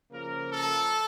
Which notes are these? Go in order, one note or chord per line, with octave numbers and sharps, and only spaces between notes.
C#3 F3 A#3 A#4
A4